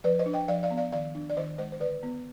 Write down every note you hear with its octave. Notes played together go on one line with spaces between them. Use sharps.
F3 B4 D5
C5 D#5
D4
D#5 G5
F3 D5 F5
D5 F5
B3
D5 F5
D#3 D5 F5
D4
D5
D#3 C5 D#5
G#3 C5 D#5
C5
D3 B4 D5
B3